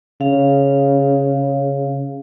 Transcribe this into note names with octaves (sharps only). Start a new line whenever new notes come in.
C#3 F5